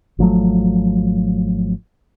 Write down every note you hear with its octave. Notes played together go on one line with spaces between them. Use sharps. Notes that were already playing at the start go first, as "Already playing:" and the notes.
G#1 F3 F#3 A3